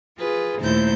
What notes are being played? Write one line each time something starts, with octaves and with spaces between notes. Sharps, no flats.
F4 G#4 B4
D#2 A#2 A3 E4 C5 G6